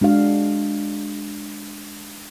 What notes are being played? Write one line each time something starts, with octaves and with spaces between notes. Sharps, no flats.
G#3 D4 F#4 F5